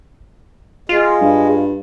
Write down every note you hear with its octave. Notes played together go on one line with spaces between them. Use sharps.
G#3 F4
G2